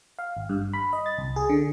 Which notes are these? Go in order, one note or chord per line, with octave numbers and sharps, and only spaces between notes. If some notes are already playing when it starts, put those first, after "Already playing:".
F5
G#1
G2
B5
D#5
A6
C2
G#4
D3